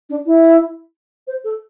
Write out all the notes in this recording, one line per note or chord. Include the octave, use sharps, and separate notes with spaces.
D4
E4
C5
A4